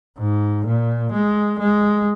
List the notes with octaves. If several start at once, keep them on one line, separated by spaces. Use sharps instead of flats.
G#2
A#2
G#3
G#3